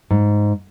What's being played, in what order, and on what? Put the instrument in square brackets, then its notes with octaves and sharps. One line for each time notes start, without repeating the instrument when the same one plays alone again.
[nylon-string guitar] G#2